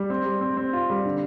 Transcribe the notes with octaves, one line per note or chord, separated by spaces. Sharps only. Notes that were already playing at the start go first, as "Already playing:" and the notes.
Already playing: G3
C4
G3
C4
C4
F4
G3
D3